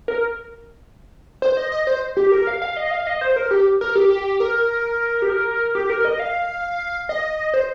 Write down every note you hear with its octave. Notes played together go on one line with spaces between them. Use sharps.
A#4
C5
D#5
D#5
C5
G4
A#4
F5
F5
D#5
F5
D#5
C5
A#4
G4
A#4
G4
A#4
G4
A#4
G4
A#4
D#5
F5
D#5
C5